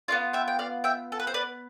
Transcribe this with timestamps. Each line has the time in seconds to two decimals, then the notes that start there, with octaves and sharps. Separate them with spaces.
0.08 B3 D4 F4 D5 F5
0.33 E5 G5
0.48 G5
0.59 D5 F5
0.84 E5 G5
1.12 A4
1.20 B4
1.27 C5
1.34 B4 D5